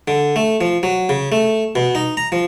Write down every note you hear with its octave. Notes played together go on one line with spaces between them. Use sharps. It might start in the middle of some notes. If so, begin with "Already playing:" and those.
D3
A3
F3
F#3
C#3
A3
B2
D#4
A#5
F3